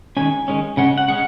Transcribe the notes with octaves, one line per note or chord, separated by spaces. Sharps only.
D#3 G#3 C#4 G#5
D#3 G#3 C#4
C#3 G#3 C#4 F#5
F#5
C#3 G#3 C#4 F#5